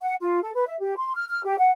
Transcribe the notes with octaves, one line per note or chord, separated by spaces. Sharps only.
F#5
F4
A4
B4
E5
G4
C6
F6
F6
G4
F#5